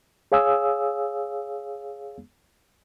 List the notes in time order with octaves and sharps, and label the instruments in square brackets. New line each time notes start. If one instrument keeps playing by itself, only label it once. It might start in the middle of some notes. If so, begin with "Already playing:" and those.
[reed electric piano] G#4 C#5 F5 G#5 D#6 E6